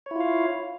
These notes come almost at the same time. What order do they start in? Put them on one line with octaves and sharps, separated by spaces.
C#5 E4 F4 F5